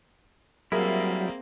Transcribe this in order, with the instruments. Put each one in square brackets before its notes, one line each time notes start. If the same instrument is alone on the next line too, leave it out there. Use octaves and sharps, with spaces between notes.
[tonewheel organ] F#3 [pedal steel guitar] G3 E4 [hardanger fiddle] A#3 C4 [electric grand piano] G#4 A#4 E5